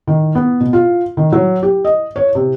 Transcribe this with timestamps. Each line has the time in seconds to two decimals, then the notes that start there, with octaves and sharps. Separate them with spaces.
0.07 D#3
0.35 B3
0.60 B2
0.73 F4
1.17 D#3
1.32 F#3
1.63 G4
1.85 D#5
2.16 C#5
2.35 C3